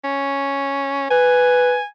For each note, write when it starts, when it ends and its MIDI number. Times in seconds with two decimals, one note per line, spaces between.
0.04 1.10 61
1.11 1.78 71
1.11 1.85 80